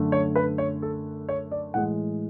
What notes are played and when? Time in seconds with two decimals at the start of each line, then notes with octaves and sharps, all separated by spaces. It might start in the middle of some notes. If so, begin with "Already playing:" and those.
Already playing: F#2 D3 A3
0.12 C#5
0.36 B4
0.58 C#5
0.82 A4
1.29 C#5
1.51 D5
1.74 A2 E3 G#3 F#5